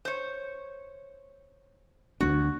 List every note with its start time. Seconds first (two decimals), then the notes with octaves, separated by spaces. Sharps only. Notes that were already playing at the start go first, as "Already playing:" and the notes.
0.05 C5 C#5
2.21 D2 A3 D4 F#4